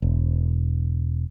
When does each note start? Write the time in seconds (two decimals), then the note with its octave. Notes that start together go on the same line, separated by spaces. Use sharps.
0.02 E1